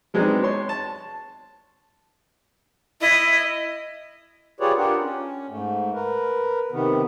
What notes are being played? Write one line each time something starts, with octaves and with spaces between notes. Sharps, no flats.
F#3 G#3 B3 C4 D4 D#4
C#5 C6
A5
E4 D#5
F4 G4 G#4 B4 C#5 D5
D4 F4 G4 A#4 F#5
C#4
G#2 A3
A#4 B4
C3 D#3 B3